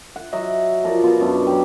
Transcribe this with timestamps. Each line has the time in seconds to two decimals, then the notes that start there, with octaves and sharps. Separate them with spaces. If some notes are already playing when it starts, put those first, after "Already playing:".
0.16 F#5
0.33 F#3 D#5 E5
0.84 F3 A#4 D5
1.04 B2 F4
1.20 F#2 B2 D4
1.47 F#3 G4